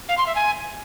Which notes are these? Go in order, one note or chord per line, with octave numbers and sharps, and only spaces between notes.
F5
C6
E5
G#5